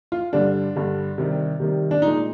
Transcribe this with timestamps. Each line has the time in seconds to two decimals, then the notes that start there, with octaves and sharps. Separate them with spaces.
0.12 F4
0.33 G2 D3 G3 D4
0.76 G2 D3 G3
1.18 C3 D#3 G3
1.60 C3 D#3 G3
1.91 D4
2.02 A#2 G#3 D#4